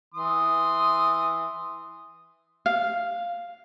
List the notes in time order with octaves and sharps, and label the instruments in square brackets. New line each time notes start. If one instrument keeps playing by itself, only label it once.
[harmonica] E3 C6 D#6
[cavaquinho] F5